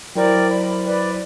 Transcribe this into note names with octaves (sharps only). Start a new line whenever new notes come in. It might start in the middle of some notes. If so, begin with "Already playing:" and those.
F#3 E4 A#4 C5 D5 G5
B5
B4 D5